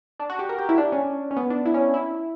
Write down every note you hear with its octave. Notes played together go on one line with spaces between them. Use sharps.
D4
F#4
G4
A#4
G4
E4
D4
C#4
C#4
B3
D4
E4
C#4
E4